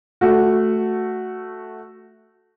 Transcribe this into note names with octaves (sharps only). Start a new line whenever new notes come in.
A3 F#4